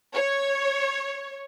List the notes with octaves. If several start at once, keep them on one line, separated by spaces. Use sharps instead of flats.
C#5